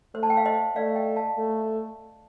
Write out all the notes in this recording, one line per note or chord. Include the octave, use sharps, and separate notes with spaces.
A3 C5
A5
G5
F5
C5 D#5
A3 D5 F5
D#5 G5
F5 A5
A3